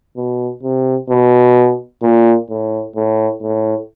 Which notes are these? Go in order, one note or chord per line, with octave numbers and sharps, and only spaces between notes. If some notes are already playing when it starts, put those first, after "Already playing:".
B2
C3
B2
A#2
A2
A2
A2